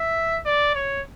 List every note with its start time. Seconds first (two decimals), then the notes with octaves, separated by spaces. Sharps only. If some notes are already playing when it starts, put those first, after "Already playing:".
Already playing: E5
0.46 D5
0.75 C#5